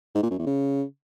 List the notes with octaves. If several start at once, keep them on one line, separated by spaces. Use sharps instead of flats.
G#2
A#2
F#2
E2
C#3